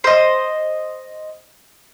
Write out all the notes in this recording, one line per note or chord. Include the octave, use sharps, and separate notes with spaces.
C5 D#5